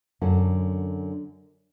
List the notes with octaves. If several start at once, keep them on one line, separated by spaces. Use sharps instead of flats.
F#2 D3 F#4 A5